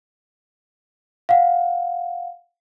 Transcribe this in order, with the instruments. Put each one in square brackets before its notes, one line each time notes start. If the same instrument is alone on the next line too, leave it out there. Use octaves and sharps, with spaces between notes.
[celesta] F5 F#5